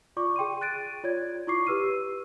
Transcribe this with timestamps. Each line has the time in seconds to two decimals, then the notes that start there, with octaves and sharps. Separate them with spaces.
0.17 F4 D5 C#6 D6
0.36 G#4 G5 C6 D#7
0.61 F#6 A6 D7 D#7
1.03 F4 C#5 D5 G#6
1.47 E4 F4 C#6 D6 C7
1.67 G4 B4 E6 F6 D#7